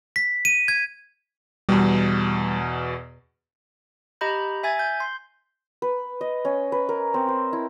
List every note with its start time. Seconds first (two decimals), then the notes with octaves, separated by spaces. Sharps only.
0.16 B6
0.45 D#7
0.68 G#6
1.69 E2 B2 G3
4.21 G4 D#5 A#5 B5 G6
4.63 E5 G#5 G#6 A6
4.79 G6
5.00 C6
5.82 B4
6.21 D#5
6.45 C#4
6.72 B4
6.89 A#4
7.14 C4
7.28 C5
7.53 E4